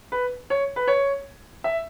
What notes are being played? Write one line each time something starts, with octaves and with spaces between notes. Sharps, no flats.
B4
C#5
B4
C#5
E5